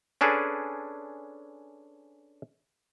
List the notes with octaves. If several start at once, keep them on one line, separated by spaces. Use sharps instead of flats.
C#4 D4 G#4 A4 B4